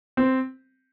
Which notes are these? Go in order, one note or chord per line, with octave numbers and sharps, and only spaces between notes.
C4